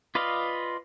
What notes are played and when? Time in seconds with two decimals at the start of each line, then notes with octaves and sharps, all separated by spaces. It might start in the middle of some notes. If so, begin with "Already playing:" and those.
0.15 F4 B4 D5 D#5 F5